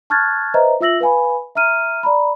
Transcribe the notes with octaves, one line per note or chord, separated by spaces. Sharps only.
A5 C#6 F6 F#6 G#6 A6
B4 C5 D#5 E5 A#5
F4 E5 E6 A#6 F#7
B4 F5 G#5 B5
E5 A#5 F6 D#7
D5 A#5 B5